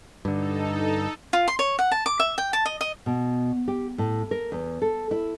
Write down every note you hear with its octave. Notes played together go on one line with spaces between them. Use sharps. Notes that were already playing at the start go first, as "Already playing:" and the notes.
G2 D3 D#4 A4
F4
C6
C#5
F#5
A5
D6
E5
G5
A5
D#5
D#5
B2
G4
A2
A#4
E2
A4
E4